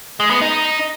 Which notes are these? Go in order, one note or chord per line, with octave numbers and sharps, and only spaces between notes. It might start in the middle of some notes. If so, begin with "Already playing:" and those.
G#3
B3
D#4